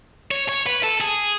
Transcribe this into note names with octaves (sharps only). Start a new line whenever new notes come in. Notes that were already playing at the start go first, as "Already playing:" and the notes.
C#5
C#5
B4
A4
G#4